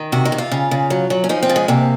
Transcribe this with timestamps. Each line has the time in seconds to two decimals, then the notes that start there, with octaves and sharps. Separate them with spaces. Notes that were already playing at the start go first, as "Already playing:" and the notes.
Already playing: D#3
0.12 C3 F#4
0.25 D#4
0.32 C3
0.38 F4
0.52 C#3
0.71 C#3
0.90 F#3
1.10 F#3
1.24 C#4
1.29 F3 D#4
1.43 C4
1.49 C#3
1.56 G#3
1.68 C3 A#3